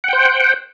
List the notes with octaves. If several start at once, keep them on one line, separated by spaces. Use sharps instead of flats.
C5 F#5 G5